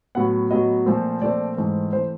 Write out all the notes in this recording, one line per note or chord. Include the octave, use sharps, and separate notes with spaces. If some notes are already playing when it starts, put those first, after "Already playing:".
A2 F#3 B3 F#5
A2 F#3 B3 D#5
A#2 F3 A3 C4
A#2 F3 A3 C4 D5
G#2 E3 A3 C4
E3 A3 C4 C5